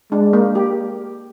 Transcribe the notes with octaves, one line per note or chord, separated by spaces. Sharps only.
G#3 D4
A#3
G4